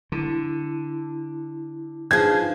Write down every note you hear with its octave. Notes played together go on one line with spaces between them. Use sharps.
D3 E4
F3 D4 D#4 G#4 B4 G#6